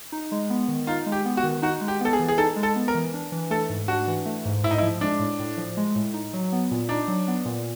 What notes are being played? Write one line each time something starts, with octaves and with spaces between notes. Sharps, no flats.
D#4
G#3
B3
D#3
D#4 F4
G#3
G4
B3
F#4
D#3
D#4 F#4
G#3
G4
B3 A4
G#4
E3
G#4
D#4 A4
G#3
A4
B3
A#4
E3
D4
E3
A3 A4
G#2
D4 F#4
E3
A3
G#2
A2 E4
D#4
E4
F3
G#3 D4
A2
A2
F3
G#3
A2
D#4
F#3
B3
A#2
D4 D#4
F#3
B3
A#2